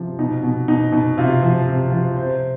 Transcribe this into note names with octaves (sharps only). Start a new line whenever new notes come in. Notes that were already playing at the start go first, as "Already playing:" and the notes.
Already playing: C3 F3
B2 D#4
B2
B2 D#4
B2 D#4
C3 F4
F3
C3
F3
C3 C5